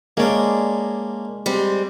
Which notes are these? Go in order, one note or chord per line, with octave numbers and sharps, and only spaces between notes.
G#3 A#3 C#4 D4 D5
G3 G#3 C4